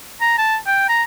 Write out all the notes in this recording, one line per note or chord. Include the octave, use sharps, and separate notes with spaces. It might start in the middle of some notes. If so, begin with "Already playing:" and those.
A#5
A5
G5
A#5